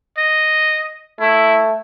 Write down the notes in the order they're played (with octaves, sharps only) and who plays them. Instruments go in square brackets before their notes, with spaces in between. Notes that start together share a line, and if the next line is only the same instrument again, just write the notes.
[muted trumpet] D#5
[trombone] A3 [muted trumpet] E4